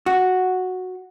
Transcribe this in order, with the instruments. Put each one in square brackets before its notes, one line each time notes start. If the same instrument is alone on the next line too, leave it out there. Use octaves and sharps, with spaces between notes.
[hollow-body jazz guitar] F#4